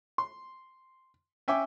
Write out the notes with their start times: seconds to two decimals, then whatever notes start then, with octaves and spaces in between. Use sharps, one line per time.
0.18 C6
1.48 C#4 E5 G5 G#5 D6